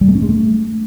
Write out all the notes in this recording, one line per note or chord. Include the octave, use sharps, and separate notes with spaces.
G3
A3
C#4
G#3
A3